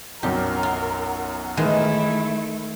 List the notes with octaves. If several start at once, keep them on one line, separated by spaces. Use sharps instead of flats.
B1 F#2 F#3 G4 A#4
F4
D#3 E3 G#3 A3 E4